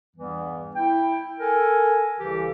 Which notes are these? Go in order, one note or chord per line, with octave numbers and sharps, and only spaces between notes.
E2 G2 E3 G3 B3
E4 G5
A4 A#4 G#5
C2 C#3 E3 G4 A4